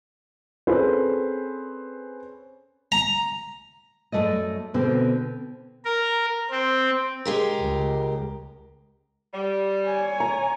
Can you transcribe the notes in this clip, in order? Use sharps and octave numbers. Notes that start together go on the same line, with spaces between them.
C4 C#4 G#4 A4 B4 C5
A#5
F#2 F3 A3 D5 D#5
B2 D3 C4
A#4
C4
G#3 G4 A#4
C#2
G3
C#5 G#5
A#5